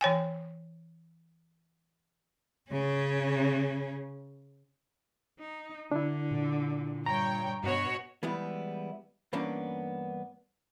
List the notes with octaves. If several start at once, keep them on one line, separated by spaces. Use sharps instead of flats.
E3 C#5 G5 G#5
C#3 C#4
D#4
D3 D4 E4
A#2
G2 C#5 G5 A#5
G2 B2 F#4 C#5
E3 G3 G#3 B3 E4
G2 E3 A#3 B3 C#4 D4